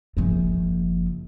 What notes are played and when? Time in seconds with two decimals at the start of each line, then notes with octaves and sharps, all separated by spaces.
0.17 F#1 F3